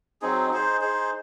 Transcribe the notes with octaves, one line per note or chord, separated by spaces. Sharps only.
F#3 C4 D#4 G#4
D#4 G#4 C5
D#4 G#4 C5